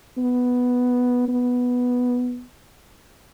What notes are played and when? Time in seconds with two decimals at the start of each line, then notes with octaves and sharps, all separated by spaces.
0.18 B3
1.28 B3